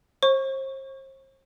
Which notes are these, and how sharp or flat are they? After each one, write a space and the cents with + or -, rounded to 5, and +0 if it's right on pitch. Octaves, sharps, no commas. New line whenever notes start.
C5 +40 C#6 +0